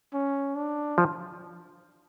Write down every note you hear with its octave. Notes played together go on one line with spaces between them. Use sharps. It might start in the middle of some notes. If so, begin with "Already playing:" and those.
C#4
D4
F3